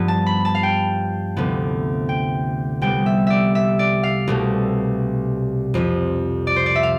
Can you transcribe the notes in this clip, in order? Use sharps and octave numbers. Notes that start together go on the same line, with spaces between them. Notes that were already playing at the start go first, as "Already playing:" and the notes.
Already playing: G2 F3 B3
A5
B5
A5
F5
G5
D2 C3 F3 B3
G5
C2 C3 G3 B3 G5
E5
D5 E5
E5
D5
F5
C2 B2 A3
F2 C3 F3
D5
C5
D5
E5
F5